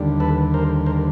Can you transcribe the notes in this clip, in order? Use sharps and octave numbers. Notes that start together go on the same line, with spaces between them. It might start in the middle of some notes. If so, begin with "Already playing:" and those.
Already playing: D#2 D3 G3
A4 B4
A#4 C5
A#4 C5